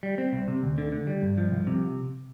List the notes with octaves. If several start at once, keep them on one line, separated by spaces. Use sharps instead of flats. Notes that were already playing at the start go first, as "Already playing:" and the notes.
G3
C4
C2
C3
D2
D3
D3
G3
G2
F3
C2
C3